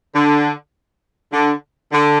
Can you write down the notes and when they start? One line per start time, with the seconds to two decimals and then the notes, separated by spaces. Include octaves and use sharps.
0.15 D3
1.32 D3
1.92 D3